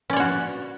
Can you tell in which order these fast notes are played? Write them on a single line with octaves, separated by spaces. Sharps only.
C#4 D5 C#5 F#4